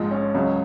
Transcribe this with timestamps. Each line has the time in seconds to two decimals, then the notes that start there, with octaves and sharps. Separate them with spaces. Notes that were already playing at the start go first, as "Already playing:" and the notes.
Already playing: A#1 G#2 F3 G#3
0.11 C#4
0.34 C#2 C#3 F#3